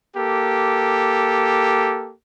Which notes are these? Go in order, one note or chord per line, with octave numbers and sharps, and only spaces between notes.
A#3 G4 A4